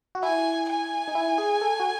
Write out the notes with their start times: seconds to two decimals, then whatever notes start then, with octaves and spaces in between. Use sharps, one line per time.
0.15 F#4
0.23 E4 G#5
0.70 G#5
1.08 D#4
1.15 E4
1.38 G#4
1.61 A4
1.80 F#4